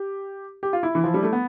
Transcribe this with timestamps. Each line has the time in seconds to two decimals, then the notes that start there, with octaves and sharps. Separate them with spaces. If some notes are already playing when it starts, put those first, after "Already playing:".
Already playing: G4
0.63 G4
0.73 F4
0.83 E4
0.95 E3
1.04 F3
1.14 G3
1.23 A3
1.33 B3